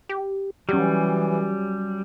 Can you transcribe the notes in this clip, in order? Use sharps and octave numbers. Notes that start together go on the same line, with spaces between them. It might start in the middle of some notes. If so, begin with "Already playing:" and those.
G4
E3 F#3 G3 C#4 G4